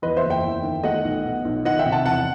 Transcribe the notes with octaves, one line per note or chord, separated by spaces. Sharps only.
E2 B4 D#5
C5 E5
F#1
E5 G5
E2
D#3
A3 D#5 F#5
B1
B2
B1
D#3 D#5 F#5
E5 G5
C3
F#5 A5
E2 F#5 A5